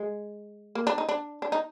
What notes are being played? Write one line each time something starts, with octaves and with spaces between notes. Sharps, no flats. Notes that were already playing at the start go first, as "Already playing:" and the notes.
Already playing: G#3
A#3
D4
D#4
D4
D4
D#4